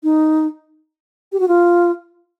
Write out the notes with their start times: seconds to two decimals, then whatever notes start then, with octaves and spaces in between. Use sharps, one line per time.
0.04 D#4
1.32 G4
1.40 F#4
1.48 F4